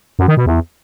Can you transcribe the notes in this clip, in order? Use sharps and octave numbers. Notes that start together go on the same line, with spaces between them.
F#2
D#3
B2
E2